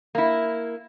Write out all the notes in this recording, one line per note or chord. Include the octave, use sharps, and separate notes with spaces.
A#3 E4